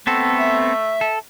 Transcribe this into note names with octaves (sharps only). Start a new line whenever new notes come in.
A3 B3 C4 A4
E5
A4